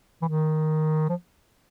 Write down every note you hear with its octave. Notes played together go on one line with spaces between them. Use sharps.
E3
D#3
F3